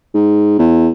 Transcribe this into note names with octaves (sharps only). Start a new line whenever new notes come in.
G#2
E2